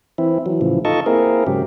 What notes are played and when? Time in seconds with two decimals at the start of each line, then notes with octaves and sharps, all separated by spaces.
0.18 E3 C4 E4
0.46 E3 F#3
0.61 A2 C#3 E3 F3
0.85 D#4 F4 A4 D#5 A5 C#6
1.06 A#3 C4 E4 G#4 A#4
1.47 G#2 C#3 F#3 G4